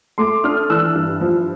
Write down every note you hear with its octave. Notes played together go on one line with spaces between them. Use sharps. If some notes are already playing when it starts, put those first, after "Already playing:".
A3 C6 D6
D4 D#6 F6
E3 E6 F#6
G2
F3